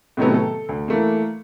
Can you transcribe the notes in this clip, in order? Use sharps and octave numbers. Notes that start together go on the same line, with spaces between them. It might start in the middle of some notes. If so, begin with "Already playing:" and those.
A2 C3 D#3 F#3 A3 B3
A4
D2
E3 A3 A#3